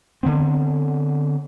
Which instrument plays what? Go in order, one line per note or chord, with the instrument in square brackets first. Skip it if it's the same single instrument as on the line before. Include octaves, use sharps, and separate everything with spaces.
[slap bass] D3 E3 B3 C4